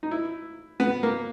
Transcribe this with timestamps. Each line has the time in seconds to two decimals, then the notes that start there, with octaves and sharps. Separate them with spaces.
0.03 D#4
0.11 E4
0.80 B3
1.03 A#3